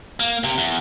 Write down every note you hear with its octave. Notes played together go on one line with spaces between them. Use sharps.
A#3
C3
E2